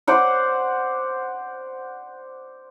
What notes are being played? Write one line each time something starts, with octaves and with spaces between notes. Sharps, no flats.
C5 D5 F#5